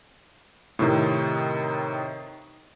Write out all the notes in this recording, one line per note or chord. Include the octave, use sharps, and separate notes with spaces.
A2 C3 D#3